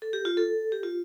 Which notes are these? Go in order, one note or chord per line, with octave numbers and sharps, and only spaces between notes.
A4
G4
F4
A4
G4
F4